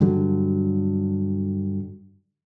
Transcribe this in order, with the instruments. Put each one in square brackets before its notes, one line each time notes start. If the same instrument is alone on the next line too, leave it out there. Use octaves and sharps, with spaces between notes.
[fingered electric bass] G2 D3 F#3